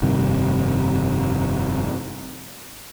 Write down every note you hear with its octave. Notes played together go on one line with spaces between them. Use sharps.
F1 G2 C3 D#3